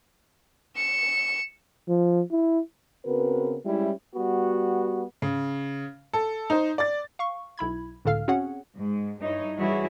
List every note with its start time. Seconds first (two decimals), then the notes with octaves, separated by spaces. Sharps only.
0.77 C#7 E7
1.88 F3
2.32 E4
3.06 C#3 B3 C4 F#4 A#4 B4
3.66 G3 G#3 C#4 E4
4.15 G3 B3 F#4
5.22 C#3
6.13 A4
6.50 D#4 C5
6.78 D5 A6
7.19 F5 C#6
7.58 B1 E4 B5 G#6
8.05 C#2 A2 D3 A4 F5 F6
8.28 C4 C#4 F#4 G#4 C#5 F#5
8.76 G#2
9.20 G2 D#4 E4 C#5
9.57 E3 G3 E4 F#4 G#4 C#5